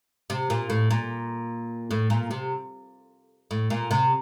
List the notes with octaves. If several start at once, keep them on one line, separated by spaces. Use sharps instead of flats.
C3
A#2
A2
A#2
A2
A#2
C3
A2
A#2
C3